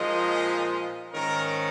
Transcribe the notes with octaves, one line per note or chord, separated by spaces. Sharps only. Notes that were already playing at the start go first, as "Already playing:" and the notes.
Already playing: A#2 F3 G#3 D#4 D#5
G#2 D#3 C#4 A#4